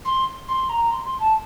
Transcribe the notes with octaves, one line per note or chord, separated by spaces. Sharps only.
C6
C6
A#5
C6
C6
A5